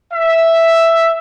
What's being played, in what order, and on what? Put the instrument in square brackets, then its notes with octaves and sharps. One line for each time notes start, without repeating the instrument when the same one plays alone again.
[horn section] E5